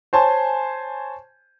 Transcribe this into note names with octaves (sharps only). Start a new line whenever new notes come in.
C5 C#5 G#5 A5 C6